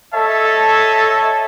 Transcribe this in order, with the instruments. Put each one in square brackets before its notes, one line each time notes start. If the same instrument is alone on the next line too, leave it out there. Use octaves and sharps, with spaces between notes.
[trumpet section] A4 C#5 D#5 E5 A5